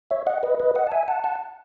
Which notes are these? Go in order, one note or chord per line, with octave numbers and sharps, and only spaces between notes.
C#5 E5
D#5 F#5
B4 D#5
B4 D#5
D#5 F#5
A5
E5 G#5
F#5 A5
F#5 A5